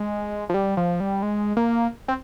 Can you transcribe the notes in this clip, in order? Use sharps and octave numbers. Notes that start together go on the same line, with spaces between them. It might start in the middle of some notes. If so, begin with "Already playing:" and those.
Already playing: G#3
F3
G3
F3
G3
G#3
A#3
C4